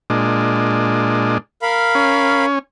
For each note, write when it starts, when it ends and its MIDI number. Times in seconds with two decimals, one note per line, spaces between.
0.10 1.38 46
0.10 1.38 56
0.10 1.38 62
1.62 2.46 70
1.62 2.46 77
1.62 2.46 83
1.95 2.59 61